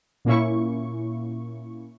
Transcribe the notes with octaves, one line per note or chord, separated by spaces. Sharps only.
A#2 A#3 C#4 E4 C#6